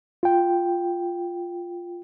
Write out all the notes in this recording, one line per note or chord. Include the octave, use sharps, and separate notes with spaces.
F4 G5